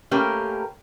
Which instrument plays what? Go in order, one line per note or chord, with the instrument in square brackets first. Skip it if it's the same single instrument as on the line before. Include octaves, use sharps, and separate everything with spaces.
[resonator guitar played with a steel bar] A3 A#3 C#4 G4 A#4 B4